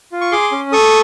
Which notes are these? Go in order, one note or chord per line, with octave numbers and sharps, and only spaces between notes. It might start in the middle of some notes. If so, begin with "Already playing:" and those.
F4
C#6
G#4 C6 D6
C#4
A4 C#6 D#6